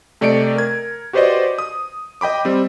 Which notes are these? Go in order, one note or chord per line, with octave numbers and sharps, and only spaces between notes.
C3 A3 D5 D#5 C#7 D7
A#4 G#6
F#4 G4 B4 C5 D5 D#5
D#6
D#5 G5 B5 D6
G3 C4